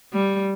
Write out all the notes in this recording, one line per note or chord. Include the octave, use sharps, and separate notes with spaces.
G3